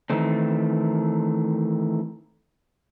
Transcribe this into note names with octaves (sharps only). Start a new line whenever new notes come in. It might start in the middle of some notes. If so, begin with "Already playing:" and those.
D#3 E3 A3 C4